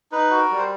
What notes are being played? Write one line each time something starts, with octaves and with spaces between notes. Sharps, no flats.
D#4 B4
F#4
A#4
G3
C5